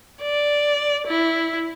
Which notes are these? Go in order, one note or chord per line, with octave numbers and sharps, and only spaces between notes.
D5
E4